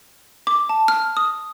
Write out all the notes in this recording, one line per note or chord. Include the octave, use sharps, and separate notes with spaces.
D6
A5
F6
D#6